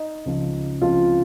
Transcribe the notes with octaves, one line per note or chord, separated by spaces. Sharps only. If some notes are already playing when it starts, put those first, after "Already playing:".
Already playing: D#4
C#2 C#3 F3
C#2 C3 F3 F4